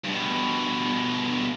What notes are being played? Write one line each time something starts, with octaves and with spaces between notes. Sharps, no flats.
G2 B2